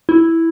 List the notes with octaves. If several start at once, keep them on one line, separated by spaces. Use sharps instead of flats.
E4